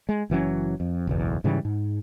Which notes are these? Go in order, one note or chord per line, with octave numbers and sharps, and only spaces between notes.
G#3
F#1 E3 F#3 C#4
F2
F#1 B1 E2
G#2 C#3 E3 G3
G#2